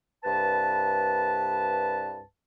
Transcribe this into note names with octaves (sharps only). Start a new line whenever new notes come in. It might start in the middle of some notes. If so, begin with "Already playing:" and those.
C2 G2 B4 A5